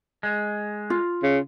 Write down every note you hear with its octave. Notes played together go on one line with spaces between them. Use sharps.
G#3
F4
C#3